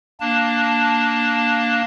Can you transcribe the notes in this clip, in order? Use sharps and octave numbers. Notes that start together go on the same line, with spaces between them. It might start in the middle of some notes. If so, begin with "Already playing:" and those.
A#3 D4 A5